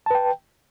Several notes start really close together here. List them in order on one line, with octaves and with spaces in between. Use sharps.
A5 B4 G5